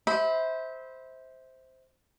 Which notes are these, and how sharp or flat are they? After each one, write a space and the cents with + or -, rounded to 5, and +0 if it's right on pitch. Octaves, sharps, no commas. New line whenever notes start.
C5 +0 E5 -30 B5 +0